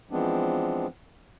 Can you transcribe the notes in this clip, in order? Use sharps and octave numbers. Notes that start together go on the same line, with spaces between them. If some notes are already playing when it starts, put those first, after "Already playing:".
E3 F3 G#3 B3 C4 D4